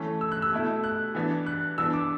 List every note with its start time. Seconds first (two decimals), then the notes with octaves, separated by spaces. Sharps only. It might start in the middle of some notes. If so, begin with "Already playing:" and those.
Already playing: E3 A3 C#4
0.21 E6
0.32 F#6
0.42 E6
0.52 B2 A3 E4
0.84 F#6
1.15 E3 B3 D4
1.46 F#6
1.78 E3 B3 D4 E6
1.94 D6